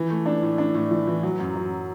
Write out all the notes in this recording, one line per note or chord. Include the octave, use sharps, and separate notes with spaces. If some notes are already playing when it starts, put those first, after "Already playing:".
Already playing: E3
A3
D4
A2
D4
A2
E3
E3
F#3
F#2
F#3